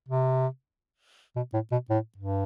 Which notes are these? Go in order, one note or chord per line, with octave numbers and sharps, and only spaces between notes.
C3
B2
A2
B2
A2
G2